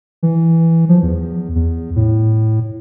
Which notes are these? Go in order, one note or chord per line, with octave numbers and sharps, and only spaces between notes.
E3
F3
E2
E2
A2